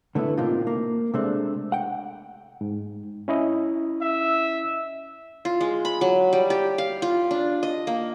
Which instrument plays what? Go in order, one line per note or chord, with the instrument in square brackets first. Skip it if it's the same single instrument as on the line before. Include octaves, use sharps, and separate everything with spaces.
[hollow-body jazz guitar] D3 A3 B3 E4
A2 C3 A#3 D#4 F4
A#3
C3 G#3 A3 C4 D4
F#5 G5
[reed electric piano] G#2
C#4 E4 D#5
[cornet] E5
[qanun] F4
G#3
B5
F#3
G3
G4
F5
F4
D4
D#5
A#3